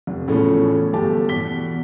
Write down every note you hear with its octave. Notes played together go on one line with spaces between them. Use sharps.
F1
E2 A2 C#3 F3 A3 C#4
G1 A3 G4 A5
E2 B2 B6 G7